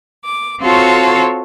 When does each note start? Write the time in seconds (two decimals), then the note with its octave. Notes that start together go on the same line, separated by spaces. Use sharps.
0.25 D6
0.60 C4 F4 F#4 A4 C#5